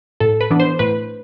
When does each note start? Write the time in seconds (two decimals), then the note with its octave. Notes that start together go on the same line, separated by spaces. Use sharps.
0.20 A2 A4
0.41 B4
0.50 E3 B3 D4
0.60 C5
0.79 A2 B4